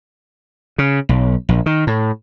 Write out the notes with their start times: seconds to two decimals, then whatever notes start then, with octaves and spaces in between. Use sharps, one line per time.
0.78 C#3
1.09 B1
1.49 A#1
1.66 D#3
1.87 A2